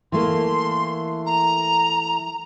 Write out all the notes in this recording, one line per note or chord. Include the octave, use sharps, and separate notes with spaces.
E3 A3 A#3 C6
A#5